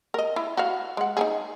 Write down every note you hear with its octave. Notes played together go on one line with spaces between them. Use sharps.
A#4 D#5
E4
F#4 F5
G#3 F#5
D#4 E4 G#4